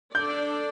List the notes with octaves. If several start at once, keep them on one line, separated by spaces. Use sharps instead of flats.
D4 A4 D5 G6